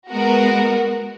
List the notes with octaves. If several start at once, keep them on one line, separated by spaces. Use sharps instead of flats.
G#3 B3 F#4 A#4